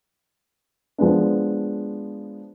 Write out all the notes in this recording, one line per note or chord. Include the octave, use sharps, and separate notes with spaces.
F3 G#3 B3 D4